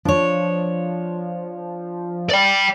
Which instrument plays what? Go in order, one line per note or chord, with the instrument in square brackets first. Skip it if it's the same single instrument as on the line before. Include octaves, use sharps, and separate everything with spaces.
[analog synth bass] F3 [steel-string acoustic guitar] D4 C#5
[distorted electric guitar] D5 G5